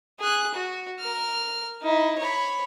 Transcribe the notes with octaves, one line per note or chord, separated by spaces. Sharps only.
G#4 F#6
F#4
A#4 F6
D#4 E4
C#5 B5